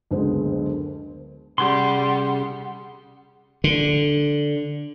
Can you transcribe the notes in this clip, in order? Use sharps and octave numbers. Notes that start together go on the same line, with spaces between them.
F#1 D2 D3 G#3 B3 C5
C3 G3 C#4 G#4 F#5 C6
D3